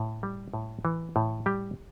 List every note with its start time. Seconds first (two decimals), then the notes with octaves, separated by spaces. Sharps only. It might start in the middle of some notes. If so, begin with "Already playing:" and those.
Already playing: A2
0.23 G3
0.53 A2
0.85 E3
1.16 A2
1.46 G3 G4